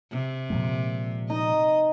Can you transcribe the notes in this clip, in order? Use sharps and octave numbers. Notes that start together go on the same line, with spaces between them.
C3
A#2 F3 G#3
D#4 D#5